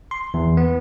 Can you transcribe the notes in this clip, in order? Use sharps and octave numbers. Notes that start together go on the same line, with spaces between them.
C6
E2
B3